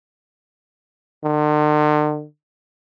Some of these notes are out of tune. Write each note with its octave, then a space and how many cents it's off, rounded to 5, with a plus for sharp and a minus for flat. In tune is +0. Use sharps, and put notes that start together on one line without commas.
D3 +45